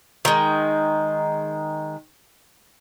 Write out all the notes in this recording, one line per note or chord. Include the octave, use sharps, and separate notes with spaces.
D#3 G#3